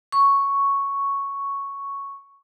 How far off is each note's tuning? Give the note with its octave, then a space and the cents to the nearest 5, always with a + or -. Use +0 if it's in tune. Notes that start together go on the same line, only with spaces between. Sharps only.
C#6 +0